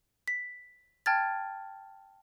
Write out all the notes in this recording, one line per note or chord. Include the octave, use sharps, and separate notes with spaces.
B6
G5 A5 F6 G#6 A6